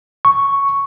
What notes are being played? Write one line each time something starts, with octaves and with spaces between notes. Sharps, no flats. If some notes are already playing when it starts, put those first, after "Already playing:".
C#6